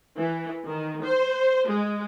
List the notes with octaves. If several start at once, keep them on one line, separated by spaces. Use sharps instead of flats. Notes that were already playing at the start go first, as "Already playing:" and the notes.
E3
D#3
C5
G#3